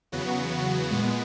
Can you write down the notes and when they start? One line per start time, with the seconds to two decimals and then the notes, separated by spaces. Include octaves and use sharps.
0.12 E2 C#3 F#3 B3 F#4
0.91 A#2 G#3 B3